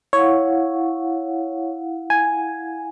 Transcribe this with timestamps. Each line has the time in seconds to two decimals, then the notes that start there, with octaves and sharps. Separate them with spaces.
0.13 E4 C#5 F5 F#5
2.10 G#5